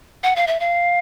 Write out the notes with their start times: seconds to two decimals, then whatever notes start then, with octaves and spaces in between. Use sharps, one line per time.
0.23 F#5
0.36 F5
0.47 E5
0.60 F5